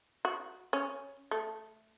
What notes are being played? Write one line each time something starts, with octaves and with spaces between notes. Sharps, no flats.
F#4
C#4
A3